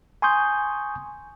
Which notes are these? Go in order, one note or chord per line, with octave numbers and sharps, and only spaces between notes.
G#5 C6 C#6 D#6 G6